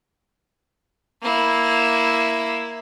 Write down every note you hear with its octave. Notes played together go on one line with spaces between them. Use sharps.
A#3 E4